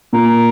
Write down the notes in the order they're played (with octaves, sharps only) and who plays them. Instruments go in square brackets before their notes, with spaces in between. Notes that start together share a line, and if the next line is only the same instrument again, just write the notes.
[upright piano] A#2 [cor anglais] A#4